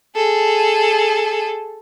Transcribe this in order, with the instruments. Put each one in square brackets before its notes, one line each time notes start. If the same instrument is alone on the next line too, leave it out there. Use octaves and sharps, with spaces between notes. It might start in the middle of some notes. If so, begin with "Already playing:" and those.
[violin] G#4 A4